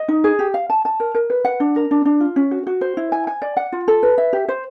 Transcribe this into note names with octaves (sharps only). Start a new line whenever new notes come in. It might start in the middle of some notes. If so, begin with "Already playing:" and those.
Already playing: D#5
D#4
G#4
G4
F5
A5
A5
A#4
A#4
B4
F#5
D4
A#4
D4
D4
F4
C#4
F#4
F#4
C5
E4
G#5
G#5
D5
F#5
F4
A4
B4
E5
G4
C5